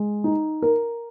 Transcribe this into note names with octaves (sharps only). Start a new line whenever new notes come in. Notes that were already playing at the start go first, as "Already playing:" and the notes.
Already playing: G#3
D#4
A#4